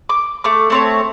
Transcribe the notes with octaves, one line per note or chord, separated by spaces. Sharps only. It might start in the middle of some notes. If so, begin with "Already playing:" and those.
D6
A3 D6
A3 C4 C#5